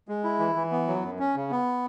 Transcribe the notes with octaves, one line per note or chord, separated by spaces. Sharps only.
G#3
E4
E3
E3
B3
F#3
F#2
C#4
C#3
B3